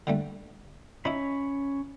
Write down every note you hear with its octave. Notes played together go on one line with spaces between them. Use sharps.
D3 G3 A3
C#4 D#4 E4 C#5 B5